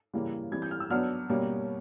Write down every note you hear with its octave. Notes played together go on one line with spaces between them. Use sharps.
C#3 E3 G3 A#3
E3 G3 C4 G#6
G6
F6
E6
F#3 B3 D4 F6
B2 G3 A#3 C#4